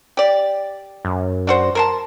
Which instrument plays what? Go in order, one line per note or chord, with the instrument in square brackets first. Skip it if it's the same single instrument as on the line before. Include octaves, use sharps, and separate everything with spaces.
[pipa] G4 D5
[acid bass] F#2
[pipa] D4 F#4 C5
A#4 C5 A5